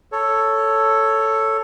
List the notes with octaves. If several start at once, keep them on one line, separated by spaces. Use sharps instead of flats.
A4 C#5